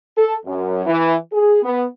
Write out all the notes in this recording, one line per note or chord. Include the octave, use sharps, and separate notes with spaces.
A4
F#2
E3
G#4
B3